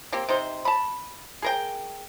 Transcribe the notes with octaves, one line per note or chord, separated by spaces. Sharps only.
A#3 C4 G4
C3 D#4 C5
A5 B5
G#4 A#4 G5